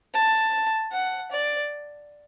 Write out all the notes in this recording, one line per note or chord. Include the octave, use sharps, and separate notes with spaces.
A5
F#5
D5